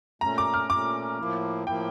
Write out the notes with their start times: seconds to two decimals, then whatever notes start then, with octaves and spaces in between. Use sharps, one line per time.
0.21 A#2 A3 C#4 A#5
0.38 D6
0.54 F6
0.70 A#2 A3 C#4 D6
1.19 A2 F3 A#3 E4
1.67 A2 F3 A#3 E4 G5